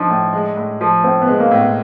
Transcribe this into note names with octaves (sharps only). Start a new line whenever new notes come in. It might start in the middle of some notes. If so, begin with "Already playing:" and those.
Already playing: F3 D4 D#4
A2
G#3
A2
F3
A2 C4
B3
G#3
A#3
A2
B3